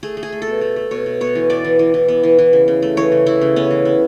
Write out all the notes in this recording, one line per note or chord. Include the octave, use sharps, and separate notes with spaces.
A3 G#4
A3
G#4
A3
A4
B2
A3
A3
B2 C#5
B2
B3 C#5
E3
B3 D5
E3
E3
E3
B3
E3
E3
C#3
C#3
A3
E3 C#5
C#3
E3 E4
C#3
B3 C#4
E3
B3